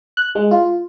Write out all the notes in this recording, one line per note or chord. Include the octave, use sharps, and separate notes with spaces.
F#6
G#3
F4